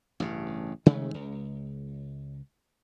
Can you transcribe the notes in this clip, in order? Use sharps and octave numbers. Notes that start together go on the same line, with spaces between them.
A1 G2 C#3
C3 D#3 G#3 A3
C#2